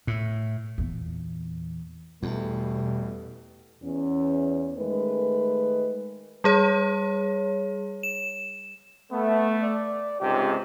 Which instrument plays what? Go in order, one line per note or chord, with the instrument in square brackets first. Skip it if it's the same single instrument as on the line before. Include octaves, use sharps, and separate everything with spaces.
[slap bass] A2
[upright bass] E2 A#2
[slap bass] E2 [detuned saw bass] B2 [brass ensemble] G3 A3
[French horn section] E2 C#4
D#3 G#3 A3 B4
[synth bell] G3 G#4 C#5
E7
[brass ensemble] A3 [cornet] B3
[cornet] D5
[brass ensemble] C#2 G#2 C3 [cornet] G4